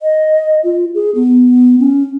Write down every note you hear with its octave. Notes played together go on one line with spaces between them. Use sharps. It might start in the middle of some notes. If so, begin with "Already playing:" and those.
D#5
F4
G#4
B3
C#4